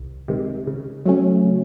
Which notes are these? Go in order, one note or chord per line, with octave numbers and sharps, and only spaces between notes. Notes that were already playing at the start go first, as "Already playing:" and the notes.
Already playing: C2 D#3
C3 D#3 G#3
C#3
F#3 A3 C#4
C#3